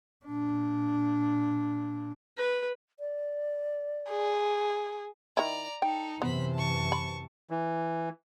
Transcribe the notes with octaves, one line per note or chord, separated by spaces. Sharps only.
A#2 D4
B4
D5
G#4
D#3 E4 D5 A#5
D#4 A4 G5
F#2 C3 E3 B3 C5 B5
A5 C#6
B5
E3